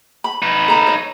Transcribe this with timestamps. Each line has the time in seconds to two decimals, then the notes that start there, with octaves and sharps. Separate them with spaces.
0.24 B5
0.42 D#4 B4
0.68 A4 A#5 B5
0.87 C#5